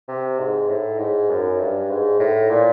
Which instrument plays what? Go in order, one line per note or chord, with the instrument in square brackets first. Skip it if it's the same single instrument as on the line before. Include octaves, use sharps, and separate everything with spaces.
[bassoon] C3
G#2
A2
G#2
F#2
G2
G#2
A2
A#2